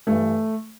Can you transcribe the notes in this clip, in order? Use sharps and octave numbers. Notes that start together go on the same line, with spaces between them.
G2 E3 A3